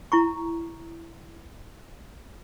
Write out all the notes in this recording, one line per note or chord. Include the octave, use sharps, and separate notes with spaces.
E4 A#5 C#6